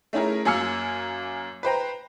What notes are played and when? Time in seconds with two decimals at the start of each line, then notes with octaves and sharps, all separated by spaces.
0.13 A3 C#4 E4 G#4 A#4
0.45 F#2 A#3 G#5 E6 F6 C#7
1.63 B4 C5 G5 A#5